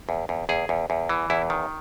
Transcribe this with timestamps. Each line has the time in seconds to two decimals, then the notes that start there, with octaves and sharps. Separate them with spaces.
0.09 E2
0.29 E2
0.49 E2 G#4
0.69 E2
0.90 E2
1.09 E3
1.30 E2 E4
1.50 D#3